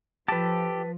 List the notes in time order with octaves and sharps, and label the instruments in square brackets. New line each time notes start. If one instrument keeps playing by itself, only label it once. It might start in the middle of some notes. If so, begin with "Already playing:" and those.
[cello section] F3 [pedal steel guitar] G4 A4 [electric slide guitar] B4 A5